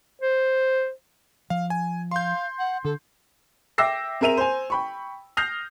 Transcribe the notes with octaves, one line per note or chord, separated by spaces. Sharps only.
C5
F3 F5
G#5
F5 C6 G6
F#5
D3 A4
E5 G5 D6 E6 A#6 C7
C4 G#4 A#4 E5 D#7 F7
C5 G#5
G5 B5 C#6
D#6 F6 G6 A#6 C7 F7